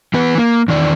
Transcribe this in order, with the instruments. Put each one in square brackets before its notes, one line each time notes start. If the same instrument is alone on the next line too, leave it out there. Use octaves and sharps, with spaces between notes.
[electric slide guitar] E3 B3 B4
A#3
E2 D#3 D5